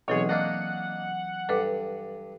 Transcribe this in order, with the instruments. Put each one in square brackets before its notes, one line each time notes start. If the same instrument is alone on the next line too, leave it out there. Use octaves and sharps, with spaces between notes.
[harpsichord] B1 G#4 [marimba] E3 F#3 C4 [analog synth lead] C#5
[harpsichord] A#3 D4 D#5 [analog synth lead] F#5
[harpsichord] G2 [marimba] A4 B4 D6